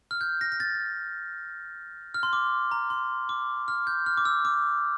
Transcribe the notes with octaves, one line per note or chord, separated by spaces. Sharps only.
F6
G6
A#6
A#6
A6
F6
C6
D6
A#5
C6
D6
F6
G6
F6
D6
E6
D6